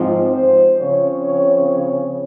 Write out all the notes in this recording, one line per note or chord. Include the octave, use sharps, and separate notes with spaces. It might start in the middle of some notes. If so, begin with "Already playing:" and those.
Already playing: G#2 F3 C4
C5
C#3 F3 C4 C#5
C#5
C#5